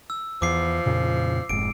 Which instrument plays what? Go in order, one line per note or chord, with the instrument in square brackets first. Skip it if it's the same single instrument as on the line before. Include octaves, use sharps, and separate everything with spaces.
[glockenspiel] E6
[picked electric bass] E2 [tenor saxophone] F3 [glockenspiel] D6 C7
[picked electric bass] F2 A#2 C#3
[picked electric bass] F1 G#2 [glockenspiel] D7